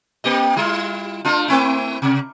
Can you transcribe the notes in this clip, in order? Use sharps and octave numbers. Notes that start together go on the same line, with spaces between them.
A#3 G4 D#5
G3 E4 F4
A3 D4 F4
A3 C4 E4
C3